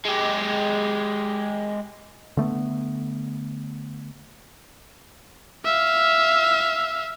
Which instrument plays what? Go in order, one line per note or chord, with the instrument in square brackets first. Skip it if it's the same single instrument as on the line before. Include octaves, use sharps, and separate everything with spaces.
[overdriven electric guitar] G#3 G4
[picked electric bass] D3 A3 B3
[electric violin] E5 F5